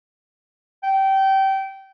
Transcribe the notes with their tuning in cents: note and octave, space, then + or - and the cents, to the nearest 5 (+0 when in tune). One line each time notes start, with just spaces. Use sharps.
G5 -20